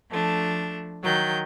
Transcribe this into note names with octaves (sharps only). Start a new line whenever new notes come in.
F3 A3 D4
D#3 F#3 G6